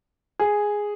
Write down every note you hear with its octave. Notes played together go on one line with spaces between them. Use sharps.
G#4